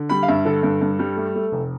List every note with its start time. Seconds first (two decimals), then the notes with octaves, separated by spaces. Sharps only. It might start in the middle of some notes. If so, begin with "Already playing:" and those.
Already playing: D3
0.09 G3 B5
0.23 F5
0.28 G2 E5
0.45 D3 A4
0.63 G2
0.81 G2
0.99 G3
1.16 A3
1.35 A3
1.52 F1